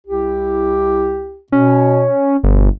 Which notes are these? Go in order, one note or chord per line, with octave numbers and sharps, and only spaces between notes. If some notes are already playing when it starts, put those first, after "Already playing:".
C2 E4 G4
B2 C#4
G1 B2